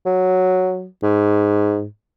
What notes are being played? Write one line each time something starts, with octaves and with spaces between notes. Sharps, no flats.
F#3
G#2